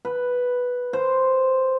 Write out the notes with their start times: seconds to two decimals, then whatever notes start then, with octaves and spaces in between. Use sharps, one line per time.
0.05 B4
0.93 C5